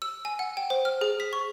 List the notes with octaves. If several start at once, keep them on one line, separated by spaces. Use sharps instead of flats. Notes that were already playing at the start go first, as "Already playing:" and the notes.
E6
G#5
F#5
G5
C5
F6
G#4
B6
C#6